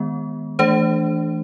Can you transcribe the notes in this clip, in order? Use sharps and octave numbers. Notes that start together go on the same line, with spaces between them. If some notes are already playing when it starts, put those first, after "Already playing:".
Already playing: D#3 G#3 B3
E3 A3 D4 C5